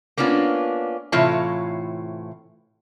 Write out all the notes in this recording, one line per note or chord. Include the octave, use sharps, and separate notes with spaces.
A#3 B3 C#4 D4 F4
A2 C3 E3 F4 C#5 A5